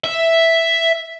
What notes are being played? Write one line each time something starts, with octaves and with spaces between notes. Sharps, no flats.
E5